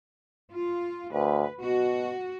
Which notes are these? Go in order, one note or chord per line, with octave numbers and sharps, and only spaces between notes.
F4
D2 B4
B2 F#4